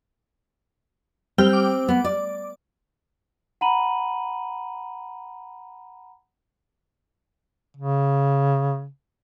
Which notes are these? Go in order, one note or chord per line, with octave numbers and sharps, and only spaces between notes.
G3 C4 G5 F6
D6
B3
D5
F#5 A#5 B5 D#7 F#7
C#3